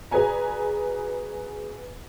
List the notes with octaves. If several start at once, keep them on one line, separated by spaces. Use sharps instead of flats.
F#4 G#4 B4 D5 G#5 A#5